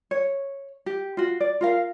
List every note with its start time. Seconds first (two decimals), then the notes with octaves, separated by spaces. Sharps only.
0.11 C#5
0.86 G4
1.17 F4 F#4
1.40 D5
1.61 F4 A#4 F5